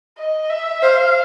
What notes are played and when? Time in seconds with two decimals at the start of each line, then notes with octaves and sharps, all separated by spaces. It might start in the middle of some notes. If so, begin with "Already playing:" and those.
0.18 D#5
0.50 E5
0.82 C5 F5